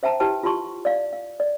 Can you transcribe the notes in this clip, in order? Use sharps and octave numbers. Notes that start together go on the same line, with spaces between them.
C5 E5 G5 A5 A#5
E4 G4 B4 G5 A5
F4 G4 A5 C6 C#6
D5 F5
F5
D5